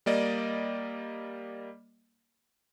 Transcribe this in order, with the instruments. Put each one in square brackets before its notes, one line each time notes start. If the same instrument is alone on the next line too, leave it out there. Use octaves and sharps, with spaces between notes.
[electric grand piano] G3 A#3 D5 D#5